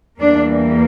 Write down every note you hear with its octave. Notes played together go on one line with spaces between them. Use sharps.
E2 E3 G3 A#3 D4